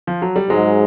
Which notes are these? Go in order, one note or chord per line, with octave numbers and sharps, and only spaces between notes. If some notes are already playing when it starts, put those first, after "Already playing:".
F3
F#3
G3
G#2 F#3 G#3